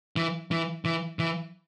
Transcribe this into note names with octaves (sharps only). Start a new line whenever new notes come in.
E3
E3
E3
E3